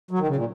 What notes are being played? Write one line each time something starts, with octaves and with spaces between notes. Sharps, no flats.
F#3
D#3
C#3
A#2